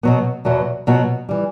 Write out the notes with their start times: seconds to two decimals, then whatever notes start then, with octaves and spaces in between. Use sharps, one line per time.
0.03 B2 F#3 B3
0.45 E2 B2 F#3 B3
0.87 B2 F#3 B3 F#4
1.29 E3 G3